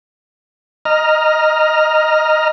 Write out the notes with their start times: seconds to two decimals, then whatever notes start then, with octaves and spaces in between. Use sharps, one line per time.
0.85 D#5 A#5 F6